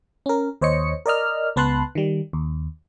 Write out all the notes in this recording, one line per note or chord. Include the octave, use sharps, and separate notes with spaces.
C#4 A#4
D#2 C5 C#5 D#5 C#7
A#4 D5 D#5 F6
C#2 B3 B4 A5 C6 F#6
D#3 G3
D#2